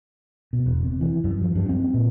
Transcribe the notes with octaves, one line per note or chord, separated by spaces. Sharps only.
B2
E1
C3
E3
F#2
F3
G2
C4
A#2